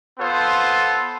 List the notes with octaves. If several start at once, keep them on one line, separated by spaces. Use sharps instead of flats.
B3 F4 A4 C5